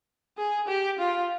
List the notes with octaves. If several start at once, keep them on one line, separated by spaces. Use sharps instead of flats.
G#4
G4
F4